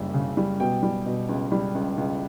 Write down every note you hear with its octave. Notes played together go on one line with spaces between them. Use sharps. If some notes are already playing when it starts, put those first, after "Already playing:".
Already playing: F#1 F#2 G3
C#3
G3
B2 G5
G3
B2
C#2
G3
C#2
C#2